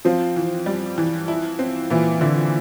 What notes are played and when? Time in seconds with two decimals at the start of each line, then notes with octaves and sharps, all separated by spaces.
0.05 F3 C4
0.36 E3
0.66 G3
0.98 E3
1.28 E4
1.59 C4
1.90 A#2 E3
2.21 D3 E4